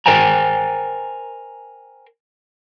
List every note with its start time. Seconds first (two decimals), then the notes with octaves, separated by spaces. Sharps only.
0.06 A#4 C5 G5 G#5 A#5